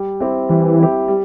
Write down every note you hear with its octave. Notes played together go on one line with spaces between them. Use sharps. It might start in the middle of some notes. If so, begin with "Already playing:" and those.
Already playing: G3
C4 E4 G4
E3 G3
C4 E4 G4
G3